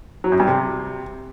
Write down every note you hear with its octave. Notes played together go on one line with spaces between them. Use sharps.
F#3
F#2
G2
C3